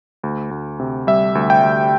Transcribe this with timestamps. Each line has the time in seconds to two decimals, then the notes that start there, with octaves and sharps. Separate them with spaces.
0.23 D2
0.51 D2
0.80 C3
1.07 G3 E5
1.35 D2
1.50 G5
1.63 D2